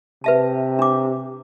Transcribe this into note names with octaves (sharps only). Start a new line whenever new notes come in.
C3 B4 E5 A5
D4 D6